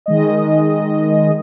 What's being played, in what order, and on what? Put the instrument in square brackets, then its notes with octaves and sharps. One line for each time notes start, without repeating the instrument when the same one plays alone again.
[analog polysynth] D#3 G#3 D#5